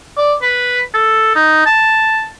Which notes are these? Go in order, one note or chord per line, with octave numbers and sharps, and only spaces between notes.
D5
B4
A4
D#4
A5